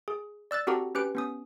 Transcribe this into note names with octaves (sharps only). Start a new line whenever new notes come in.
G#4
D5 E6 F#6 A6
C4 F#4 G4 A4 F#5 A#5
C#4 G4 B4 F#6 D7
B3 C#4 D#6